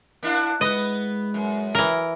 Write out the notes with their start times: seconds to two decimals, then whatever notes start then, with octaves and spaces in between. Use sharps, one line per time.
0.23 A#3 D4 E4
0.61 G#3 B3 B4 D#5
1.34 F#2
1.75 E3 A#4